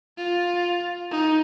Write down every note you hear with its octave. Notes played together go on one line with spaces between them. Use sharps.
F4
D#4